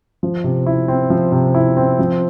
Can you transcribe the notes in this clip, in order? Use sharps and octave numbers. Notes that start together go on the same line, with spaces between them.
F3
C3
E4
C4
F3
C3
E4
C4
F3